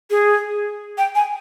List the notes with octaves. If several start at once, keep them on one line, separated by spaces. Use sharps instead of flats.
G#4
G5
G#5